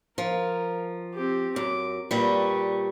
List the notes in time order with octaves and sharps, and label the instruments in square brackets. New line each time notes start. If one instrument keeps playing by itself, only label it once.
[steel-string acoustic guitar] F3 [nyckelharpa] A#4
[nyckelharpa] C4 G4
[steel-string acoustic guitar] F#2 [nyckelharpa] D6
[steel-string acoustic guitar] A#2 G3 [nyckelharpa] B4 C#6